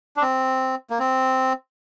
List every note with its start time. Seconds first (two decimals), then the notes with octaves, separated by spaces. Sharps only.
0.16 D4
0.22 C4
0.90 A#3
0.99 C4